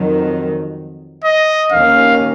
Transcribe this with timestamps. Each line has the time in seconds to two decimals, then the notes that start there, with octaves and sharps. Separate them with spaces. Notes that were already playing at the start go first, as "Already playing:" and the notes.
Already playing: F2 D#3 F#3
1.24 D#5
1.72 D#2 D#3 A#3 C#4 F5